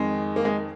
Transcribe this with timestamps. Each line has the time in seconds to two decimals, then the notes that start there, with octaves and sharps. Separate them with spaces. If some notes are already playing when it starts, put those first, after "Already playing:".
Already playing: F2 D#3 G#3
0.36 A#3
0.45 G#3